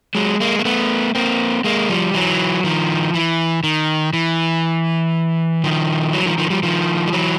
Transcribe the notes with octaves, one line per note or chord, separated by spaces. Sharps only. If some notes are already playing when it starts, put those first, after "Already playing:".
F#3 G#3
G#3 A#3
A#3
A3 B3
A#3 C4
G#3 A#3
F3 G3
E3 F#3
D#3 F3
E3
D#3
E3
D#3 F3
E3 F#3
D#3 F3
D#3 F3
F3 G3
D#3 F3
G3
E3 F#3